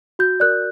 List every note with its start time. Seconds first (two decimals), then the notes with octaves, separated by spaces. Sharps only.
0.19 F#4 G6
0.40 A#4 D5 F#6